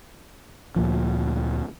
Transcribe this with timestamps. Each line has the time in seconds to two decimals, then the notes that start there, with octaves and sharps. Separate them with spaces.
0.76 D2 A#2 F3